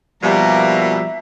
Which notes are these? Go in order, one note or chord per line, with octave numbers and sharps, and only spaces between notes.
D#2 B2 F3 G3 A#3 A#4 E5